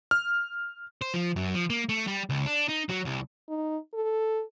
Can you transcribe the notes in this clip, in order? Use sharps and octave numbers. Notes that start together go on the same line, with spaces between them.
F6
C5
F3
F#2
F3
A#3
A3
G3
C#2
D4
D#4
F#3
C2
D#4
A4